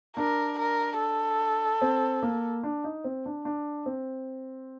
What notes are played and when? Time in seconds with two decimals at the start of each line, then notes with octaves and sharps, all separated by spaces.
0.17 D4 A#4
0.59 A#4
0.99 A4
1.81 C4
2.22 A#3
2.63 D4
2.84 D#4
3.04 C4
3.26 D4
3.45 D4
3.86 C4